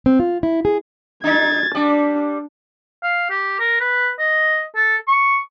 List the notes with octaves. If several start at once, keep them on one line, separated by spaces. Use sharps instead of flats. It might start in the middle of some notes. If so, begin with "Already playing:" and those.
C4
F4
E4
G#4
D4 D#4 G#6 A6
G3 D4 D5
F5
G4
A#4
B4
D#5
A4
C#6